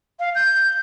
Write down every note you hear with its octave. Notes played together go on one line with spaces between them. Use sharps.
F5
G6